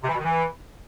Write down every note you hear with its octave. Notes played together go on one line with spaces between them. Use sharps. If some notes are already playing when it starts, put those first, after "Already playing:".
C3
E3
B2
D#3
E3